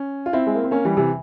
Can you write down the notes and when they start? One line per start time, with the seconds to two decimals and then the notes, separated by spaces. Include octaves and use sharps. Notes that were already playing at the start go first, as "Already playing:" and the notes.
Already playing: C#4
0.26 F4
0.33 C4 E4
0.47 G#3
0.55 A#3
0.64 C4
0.71 A#3 C#4
0.85 E3 G3
0.97 C3 E3